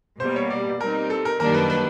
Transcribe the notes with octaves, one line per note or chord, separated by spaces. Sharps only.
B2 G3 A#3 C5
C#5
D5
G3 C4 D#4 A#4
A4
A#4
F#2 D#3 G3 A#3 D4 A#4
B4
B4